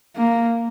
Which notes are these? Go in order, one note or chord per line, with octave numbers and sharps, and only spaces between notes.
A#3